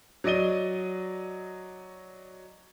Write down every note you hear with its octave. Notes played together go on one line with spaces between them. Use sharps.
F#3 D5 D#5 D#7 G7